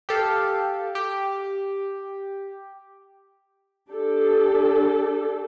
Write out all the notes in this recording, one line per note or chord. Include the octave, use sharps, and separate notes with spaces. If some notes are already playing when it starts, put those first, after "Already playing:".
G4 A4 F5
G4
D4 G4 A4